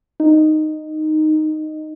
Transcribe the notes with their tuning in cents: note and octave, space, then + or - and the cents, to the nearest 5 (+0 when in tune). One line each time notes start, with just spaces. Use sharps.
D#4 -10